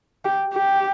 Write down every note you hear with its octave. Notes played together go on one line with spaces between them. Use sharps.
G4
G4